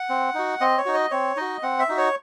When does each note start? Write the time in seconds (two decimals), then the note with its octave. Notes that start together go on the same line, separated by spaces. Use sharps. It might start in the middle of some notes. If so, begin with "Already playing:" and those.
Already playing: F#5
0.09 C4
0.35 D#4 F#4
0.61 C4 D#5
0.78 C#5
0.85 D#4 F#4
0.94 D#5
1.11 C4 C#5
1.37 D#4 F#4 D#5
1.63 C4 F#5
1.79 E5
1.89 D#4 F#4
1.97 C#5